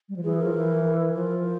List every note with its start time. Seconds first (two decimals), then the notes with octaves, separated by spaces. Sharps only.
0.09 G3
0.16 F3
0.24 E3 G#4
0.39 F3 A#4
0.54 E3
1.14 F3 A#4
1.44 C5